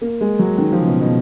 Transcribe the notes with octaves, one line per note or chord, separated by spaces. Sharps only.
A#3
G#3
F#3
D#3
F3
C#3
B2
B2